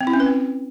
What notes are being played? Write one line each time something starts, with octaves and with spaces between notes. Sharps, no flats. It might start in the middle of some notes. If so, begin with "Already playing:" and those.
C4
E4
C#4
B4
C4